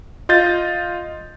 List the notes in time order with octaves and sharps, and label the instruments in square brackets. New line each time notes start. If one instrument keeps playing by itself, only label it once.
[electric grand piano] F4 D#5 G6 A6